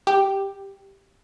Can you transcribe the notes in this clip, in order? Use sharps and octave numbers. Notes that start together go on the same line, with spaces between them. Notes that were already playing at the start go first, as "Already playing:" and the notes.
G4